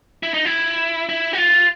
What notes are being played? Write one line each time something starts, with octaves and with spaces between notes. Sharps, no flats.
E4
D#4
E4
E4
F#4
F4